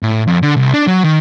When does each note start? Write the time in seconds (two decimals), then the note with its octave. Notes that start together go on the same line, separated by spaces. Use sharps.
0.03 A2
0.27 F2
0.42 D3
0.56 C2
0.74 D4
0.87 F#3
1.04 D#3